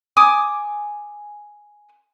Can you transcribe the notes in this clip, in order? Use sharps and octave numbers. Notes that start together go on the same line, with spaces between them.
G#5 D6 D#6